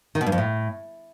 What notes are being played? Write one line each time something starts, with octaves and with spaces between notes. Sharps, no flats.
D#3
B2
G2
F2
A2